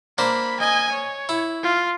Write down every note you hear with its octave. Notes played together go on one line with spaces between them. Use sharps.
A#3 D4 C5 B5
D#5 G#5
C#5
E4
F4